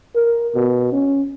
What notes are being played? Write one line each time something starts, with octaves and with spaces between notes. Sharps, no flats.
A#4
B2
C#4